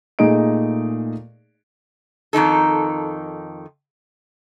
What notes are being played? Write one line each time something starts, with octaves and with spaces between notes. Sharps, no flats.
A#2 A3 D#4 G#4 D#5 D7
F2 D#3 D#4 A4